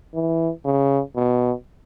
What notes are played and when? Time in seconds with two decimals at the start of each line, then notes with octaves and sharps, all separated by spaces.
0.14 E3
0.65 C#3
1.16 B2